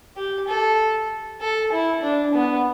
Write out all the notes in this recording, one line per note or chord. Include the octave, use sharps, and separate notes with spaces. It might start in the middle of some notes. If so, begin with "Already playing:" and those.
G4
A4
A4
E4
D4
B3